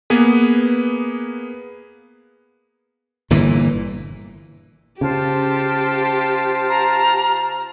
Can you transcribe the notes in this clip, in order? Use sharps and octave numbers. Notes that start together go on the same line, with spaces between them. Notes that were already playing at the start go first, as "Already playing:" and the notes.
A#3 B3 G#4 B4
G1 A#2 E3
C#3 F4 G4 C5 A5
A#5